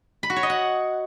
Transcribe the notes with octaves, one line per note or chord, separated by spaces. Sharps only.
B5
F#4
C#5
D#5
F#5